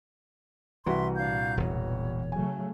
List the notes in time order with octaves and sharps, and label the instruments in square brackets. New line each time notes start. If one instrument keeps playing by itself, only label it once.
[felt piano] C2 F#4 B4 [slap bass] E3 [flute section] E5 C6
[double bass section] A#2 [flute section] D4 F5 G6
[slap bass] E1 E2 [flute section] C#5
[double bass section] C#3 F#3 A3 [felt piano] G#5